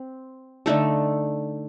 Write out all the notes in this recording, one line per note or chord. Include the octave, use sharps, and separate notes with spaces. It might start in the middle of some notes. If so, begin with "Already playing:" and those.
Already playing: C4
D3 A3 D#4 A4